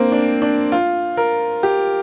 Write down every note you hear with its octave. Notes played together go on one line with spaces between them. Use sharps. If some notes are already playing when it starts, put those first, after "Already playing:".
Already playing: A#3 C4 D4
D4
D4
F4
A#4
G4